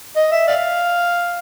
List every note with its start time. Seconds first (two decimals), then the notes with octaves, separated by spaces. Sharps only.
0.16 D#5
0.32 E5
0.48 D5 F5